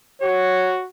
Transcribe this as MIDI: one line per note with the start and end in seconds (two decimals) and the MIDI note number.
0.21 0.86 66
0.21 0.78 73